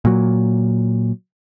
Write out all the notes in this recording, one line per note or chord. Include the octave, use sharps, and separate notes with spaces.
A#2 F#3